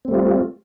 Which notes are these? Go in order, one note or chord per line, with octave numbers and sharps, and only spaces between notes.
G3 A3 C4 F4